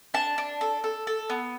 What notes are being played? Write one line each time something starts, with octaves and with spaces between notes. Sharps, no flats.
D4 A5
D4
A4
A4
A4
B3